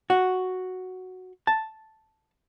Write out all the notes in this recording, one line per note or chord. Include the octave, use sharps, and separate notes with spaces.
F#4
A5